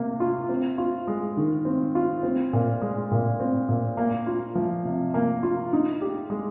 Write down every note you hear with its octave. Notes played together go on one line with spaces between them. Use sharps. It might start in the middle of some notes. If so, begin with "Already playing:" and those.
Already playing: C3 A#3
F4
C4
F4
G#3
D#3
C4
F4
C4
A#2
G#3
A#2
C4
A#2
A#3
F4
F3
C3
A#3
F4
D#4
G4
G#3